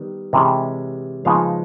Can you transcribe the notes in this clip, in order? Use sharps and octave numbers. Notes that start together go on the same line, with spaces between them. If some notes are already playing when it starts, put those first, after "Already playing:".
Already playing: D#3 G3 B3
C3 E3 G#3 C#4
C#3 F3 G#3 B3 D#4 F5